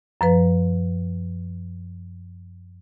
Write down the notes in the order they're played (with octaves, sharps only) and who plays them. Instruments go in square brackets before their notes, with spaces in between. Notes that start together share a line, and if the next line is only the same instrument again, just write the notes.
[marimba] F#2 F3 B4